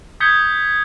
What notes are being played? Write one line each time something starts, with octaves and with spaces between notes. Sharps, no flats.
D#6 G6 G#6 B6 C#7 G7